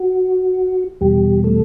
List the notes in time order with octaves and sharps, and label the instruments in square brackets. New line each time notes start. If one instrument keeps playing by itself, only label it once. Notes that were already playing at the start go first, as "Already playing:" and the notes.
Already playing: [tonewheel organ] F#4
E2 B2 G3 G4
A3 A4